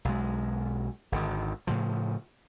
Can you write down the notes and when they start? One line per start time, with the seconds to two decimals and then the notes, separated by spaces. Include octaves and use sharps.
0.05 B1 G#3
1.12 G#1 D3 D#3
1.67 A2 C#3 F3